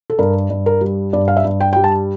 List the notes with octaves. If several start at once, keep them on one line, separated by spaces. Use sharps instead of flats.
A4
G2 A#4
G2
A#4
G3
G2 D5
F5
E5
G2
G5
G3 G5
A5